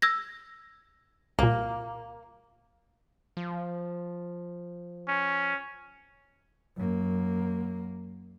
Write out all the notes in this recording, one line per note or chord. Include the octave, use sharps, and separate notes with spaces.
E6 G#6 A#6
C2 A#2 A#3
F3
C#4
F#2 A#3